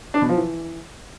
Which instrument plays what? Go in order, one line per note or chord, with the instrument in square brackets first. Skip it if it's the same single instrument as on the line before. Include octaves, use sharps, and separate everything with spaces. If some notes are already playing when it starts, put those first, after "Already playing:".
[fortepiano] D4
B2
F3
E3